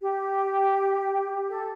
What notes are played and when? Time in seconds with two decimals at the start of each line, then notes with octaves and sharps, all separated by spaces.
0.01 G4
1.49 A4